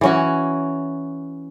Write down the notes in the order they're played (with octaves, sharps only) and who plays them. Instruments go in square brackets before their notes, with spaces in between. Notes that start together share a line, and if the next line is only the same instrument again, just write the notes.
[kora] E3 C#4 F#4